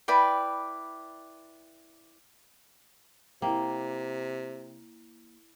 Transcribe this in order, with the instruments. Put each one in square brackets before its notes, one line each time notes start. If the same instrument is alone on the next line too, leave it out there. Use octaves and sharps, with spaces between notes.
[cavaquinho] E4 B4 D5 G5
[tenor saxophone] C3 [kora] A#3 [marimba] E4 G5